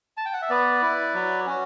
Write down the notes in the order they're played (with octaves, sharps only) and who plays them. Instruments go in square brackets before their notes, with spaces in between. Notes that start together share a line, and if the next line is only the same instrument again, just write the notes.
[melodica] A5
G5
F#5
E5
B3 B4 D5
E4
F#3
C#4 F#4